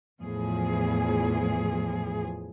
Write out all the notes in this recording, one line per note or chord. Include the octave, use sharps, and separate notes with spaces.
E2 A2 F3 G#4